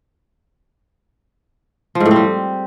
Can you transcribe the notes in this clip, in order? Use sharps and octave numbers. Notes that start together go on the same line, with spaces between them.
F3
G#2
A2
C4
G3